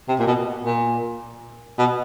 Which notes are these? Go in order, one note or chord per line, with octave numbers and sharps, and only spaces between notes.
C3
A#2
B2
A#2
B2